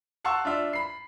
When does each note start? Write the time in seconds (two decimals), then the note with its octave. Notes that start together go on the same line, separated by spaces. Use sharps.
0.25 F5 F#5 A5 C6 C#6 E6
0.45 D4 F4 E5
0.73 B5 C7